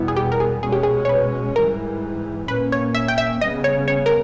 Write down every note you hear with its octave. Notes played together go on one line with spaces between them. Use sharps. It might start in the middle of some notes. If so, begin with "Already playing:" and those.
Already playing: E2 B2 G3 B3 E4
G#4
G4
A#4
G#4
B2 G#3 C#4 G#4
G4
G#4
C#5
B4
G#2 E3 G3 A#4
A#2 A#3 C#4 B4
C#5
E5
G5
E5
C#3 G3 B3 D#5
C#5
C#5
A#4